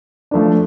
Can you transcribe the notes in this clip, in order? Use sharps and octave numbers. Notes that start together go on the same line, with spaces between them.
F3 A3 D4